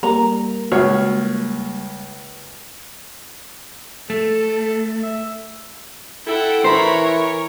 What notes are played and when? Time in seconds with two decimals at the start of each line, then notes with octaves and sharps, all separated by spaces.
0.03 G3 A#3 A#5
0.72 C#2 F#4 C#5 F6
4.10 A3 A4
5.03 E5
6.26 E4 A4 F#5 G5
6.64 E3 A3 A#4 C5 C#5 A#5 B5